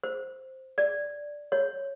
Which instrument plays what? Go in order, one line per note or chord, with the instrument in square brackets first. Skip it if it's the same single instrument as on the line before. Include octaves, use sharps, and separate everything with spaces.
[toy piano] C5
D5
C#5